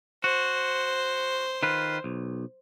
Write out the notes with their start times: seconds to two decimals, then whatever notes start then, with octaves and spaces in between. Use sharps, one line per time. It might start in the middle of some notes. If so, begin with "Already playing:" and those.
0.24 F#4 C5
1.63 D#3 F4 B4
2.04 B1